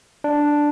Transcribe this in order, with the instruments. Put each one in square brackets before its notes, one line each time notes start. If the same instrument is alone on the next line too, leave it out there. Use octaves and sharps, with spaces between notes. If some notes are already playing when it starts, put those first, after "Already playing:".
[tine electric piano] D4